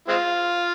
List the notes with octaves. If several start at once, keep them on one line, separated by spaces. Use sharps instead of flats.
G#3 C4 F4